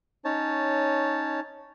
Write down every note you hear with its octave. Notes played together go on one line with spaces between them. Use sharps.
C#4 D#4 C#5 A5